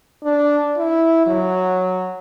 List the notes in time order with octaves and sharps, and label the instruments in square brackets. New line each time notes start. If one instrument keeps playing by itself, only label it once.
[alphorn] D4
E4
F#3